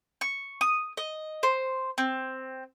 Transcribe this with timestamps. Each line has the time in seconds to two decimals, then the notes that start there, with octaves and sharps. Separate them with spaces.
0.21 C#6
0.61 D#6
0.97 D#5
1.43 C5
1.98 C4